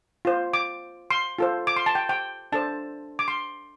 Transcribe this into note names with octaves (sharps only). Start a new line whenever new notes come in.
F4 C5
D6
C6
F4 A4 C5
D6
C6
A5
G5
G5
D4 A4 C5 A5
D6
C6